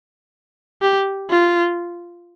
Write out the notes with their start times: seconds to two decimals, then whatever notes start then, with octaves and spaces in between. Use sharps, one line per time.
0.82 G4
1.30 F4